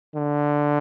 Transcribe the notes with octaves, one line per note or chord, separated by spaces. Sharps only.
D3